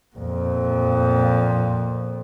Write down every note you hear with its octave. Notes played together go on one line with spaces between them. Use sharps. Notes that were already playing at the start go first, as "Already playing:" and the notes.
F2 A#2